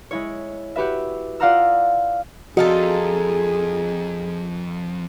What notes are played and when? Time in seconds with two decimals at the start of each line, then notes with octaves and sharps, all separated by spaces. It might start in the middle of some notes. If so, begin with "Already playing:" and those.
0.11 G#3 E4 C#5
0.76 F#4 G4 B4 E5
1.40 F4 D5 F5 F#5 A#5 E6
2.57 F2 D#4 F4 F#4 G#4 A4